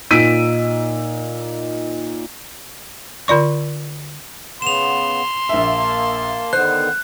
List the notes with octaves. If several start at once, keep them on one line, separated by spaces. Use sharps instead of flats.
A#2 D#4 E6 B6 D7 D#7
D3 F4 D5 C#6
C#3 B3 C6 E7 F7
A#1 A#3 E5 A5
D3 D#3 B3 C5 F#6